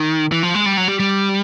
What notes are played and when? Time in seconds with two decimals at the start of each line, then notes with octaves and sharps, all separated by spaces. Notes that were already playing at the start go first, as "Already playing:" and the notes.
Already playing: D#3
0.32 E3
0.43 F3
0.55 G#3
0.66 G3
0.77 F#3
0.88 G3
1.00 G3